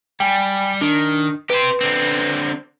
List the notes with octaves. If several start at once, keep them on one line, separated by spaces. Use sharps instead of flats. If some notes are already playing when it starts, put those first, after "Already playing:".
G3 G5 G#5
D#3 D4
G4 B4 C5
D3 C4